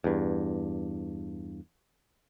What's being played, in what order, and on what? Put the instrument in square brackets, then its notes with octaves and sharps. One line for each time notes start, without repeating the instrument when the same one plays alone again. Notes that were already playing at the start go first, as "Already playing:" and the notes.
[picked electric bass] E2 G2